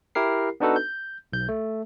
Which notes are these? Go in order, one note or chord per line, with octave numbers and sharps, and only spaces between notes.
E4 G4 A#4 C7
B3 D4 D#4 F#4 A4 B4
G6
B1 G6
A3